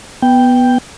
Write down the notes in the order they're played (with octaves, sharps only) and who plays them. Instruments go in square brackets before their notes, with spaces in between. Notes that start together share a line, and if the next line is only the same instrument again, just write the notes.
[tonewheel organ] B3 G5